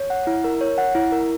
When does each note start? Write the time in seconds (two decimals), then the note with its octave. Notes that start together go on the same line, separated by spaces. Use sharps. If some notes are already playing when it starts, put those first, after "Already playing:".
Already playing: C#5
0.10 F#5
0.27 E4
0.44 A#4
0.61 C#5
0.78 F#5
0.95 E4
1.12 A#4